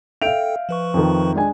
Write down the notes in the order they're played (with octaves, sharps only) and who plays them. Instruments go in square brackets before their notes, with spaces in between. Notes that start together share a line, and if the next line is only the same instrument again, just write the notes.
[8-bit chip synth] A4 G5 [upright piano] E5 F5 [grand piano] G6 D7 F7
[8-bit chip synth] F3 B4 C#6
[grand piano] F2 D#3
G#3 D4 G#5